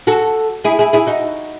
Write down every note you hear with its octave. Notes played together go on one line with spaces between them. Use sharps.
F#4 A4
E4 G#4
E4 G#4
E4 G#4
D#4 F#4